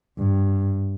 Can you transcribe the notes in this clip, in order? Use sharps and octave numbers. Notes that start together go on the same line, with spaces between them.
G2